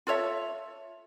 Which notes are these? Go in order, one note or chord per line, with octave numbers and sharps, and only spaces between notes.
F4 A4 C#5 E5